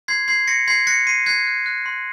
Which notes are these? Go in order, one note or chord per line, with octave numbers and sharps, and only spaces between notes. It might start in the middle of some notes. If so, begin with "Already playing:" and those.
C6 G#6 C7
C6 G#6 C7
C6 A#6 C#7
C6 G#6 C7
F#6 A#6 C#7
C6 C7 D#7
F#6 G#6 C7
F#6
F#6
C6